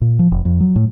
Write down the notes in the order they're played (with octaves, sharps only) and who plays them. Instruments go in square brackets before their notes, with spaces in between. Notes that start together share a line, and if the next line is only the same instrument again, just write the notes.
[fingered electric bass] A#2
F3
F1
F2
F#3
A2